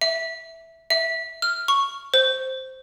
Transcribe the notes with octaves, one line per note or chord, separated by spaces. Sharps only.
E5
E5
F6
C#6
C5